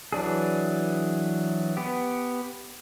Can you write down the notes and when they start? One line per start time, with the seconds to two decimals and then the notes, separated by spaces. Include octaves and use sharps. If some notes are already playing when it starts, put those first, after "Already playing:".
0.12 E3 F#3 D4 G#4
1.77 B3 G4